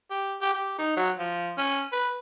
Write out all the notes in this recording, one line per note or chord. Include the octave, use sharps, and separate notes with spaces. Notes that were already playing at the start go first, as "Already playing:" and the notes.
G4
G4
G4
D#4
F#3
F3
C#4
B4